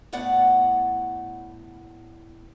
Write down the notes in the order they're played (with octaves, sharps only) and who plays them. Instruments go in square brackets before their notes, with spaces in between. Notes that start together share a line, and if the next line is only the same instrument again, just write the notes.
[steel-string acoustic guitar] A2 B3 D5 F#5